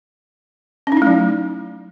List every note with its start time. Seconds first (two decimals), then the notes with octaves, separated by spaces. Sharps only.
0.87 C#4
0.92 D#4
0.97 E4
1.02 A3
1.07 F#3